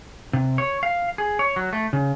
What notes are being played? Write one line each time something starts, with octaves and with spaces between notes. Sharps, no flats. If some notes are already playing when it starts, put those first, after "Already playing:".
C3
C#5
F5
G#4
C#5
F#3
A3
C#3